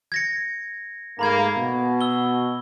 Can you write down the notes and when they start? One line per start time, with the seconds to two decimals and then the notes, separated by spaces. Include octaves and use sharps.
0.12 G#6 A#6 C#7
1.19 G#2 A3 A#3 A#5 B5 G#6
1.56 B2
2.01 E6 G7